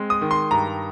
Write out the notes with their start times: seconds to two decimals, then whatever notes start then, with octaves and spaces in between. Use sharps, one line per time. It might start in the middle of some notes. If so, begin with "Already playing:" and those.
Already playing: G#3 C4
0.10 D#6
0.21 D#3
0.31 C6
0.51 G2 A#5